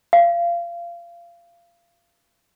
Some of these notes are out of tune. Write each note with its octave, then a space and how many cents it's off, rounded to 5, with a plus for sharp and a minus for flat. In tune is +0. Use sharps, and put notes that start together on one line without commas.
F5 -25